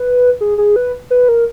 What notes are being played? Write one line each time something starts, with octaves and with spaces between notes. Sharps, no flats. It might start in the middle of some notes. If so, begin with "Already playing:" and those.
Already playing: B4
G#4
G#4
B4
B4
A#4